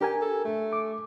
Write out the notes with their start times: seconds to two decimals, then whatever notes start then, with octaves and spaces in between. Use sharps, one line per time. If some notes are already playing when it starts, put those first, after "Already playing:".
0.01 D4 G4 A#4 G#5
0.22 A4
0.45 A3
0.73 D6